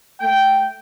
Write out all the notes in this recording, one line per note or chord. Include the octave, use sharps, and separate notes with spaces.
A3 G5